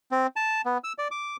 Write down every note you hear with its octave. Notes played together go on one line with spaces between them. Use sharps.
C4
A5
B3
E6
D5
D6